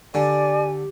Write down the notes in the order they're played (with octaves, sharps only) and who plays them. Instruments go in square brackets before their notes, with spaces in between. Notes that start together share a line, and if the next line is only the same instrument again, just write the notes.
[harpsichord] D3 [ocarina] G4 [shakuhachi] D5 [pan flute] G#5